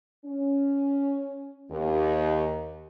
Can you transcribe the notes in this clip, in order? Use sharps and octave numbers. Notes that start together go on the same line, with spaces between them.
C#4
D#2